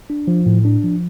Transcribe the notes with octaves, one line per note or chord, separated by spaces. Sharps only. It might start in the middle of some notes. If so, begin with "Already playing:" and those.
D4
F3
A2
D4
F3